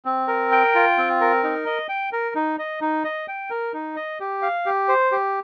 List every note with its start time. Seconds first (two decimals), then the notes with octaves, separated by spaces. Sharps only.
0.05 C4
0.28 A#4
0.52 G5
0.75 F4
0.98 C4
1.21 A#4
1.44 D#4
1.66 D#5
1.89 G5
2.13 A#4
2.35 D#4
2.59 D#5
2.81 D#4
3.04 D#5
3.28 G5
3.50 A#4
3.74 D#4
3.96 D#5
4.20 G4
4.42 F5
4.66 G4
4.88 C5
5.12 G4